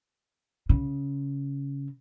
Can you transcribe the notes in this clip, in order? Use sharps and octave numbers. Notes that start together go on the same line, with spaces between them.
C#3